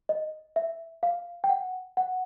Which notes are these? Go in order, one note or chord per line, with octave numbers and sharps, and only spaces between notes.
D#5
E5
F5
G5
F#5
F#5